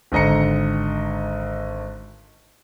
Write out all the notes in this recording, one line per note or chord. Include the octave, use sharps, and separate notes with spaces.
G#1 D3 D#5 A#5 C#7